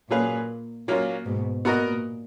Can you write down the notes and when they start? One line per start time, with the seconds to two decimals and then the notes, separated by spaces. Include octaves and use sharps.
0.10 A#2 F#3 C#4 G#4 B4 F5
0.87 A#2 F#3 A#3 C#4 F4
1.26 G#2 B2
1.65 A#2 B3 F#4 A#4 D#5